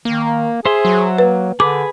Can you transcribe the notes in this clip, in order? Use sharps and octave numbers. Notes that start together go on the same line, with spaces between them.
D#3 A#3
G#4 C5 E5 C6
F#3
A#3 B4
D3 G#4 B4 D6